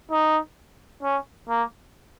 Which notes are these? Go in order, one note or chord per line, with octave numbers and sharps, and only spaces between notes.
D#4
C#4
A#3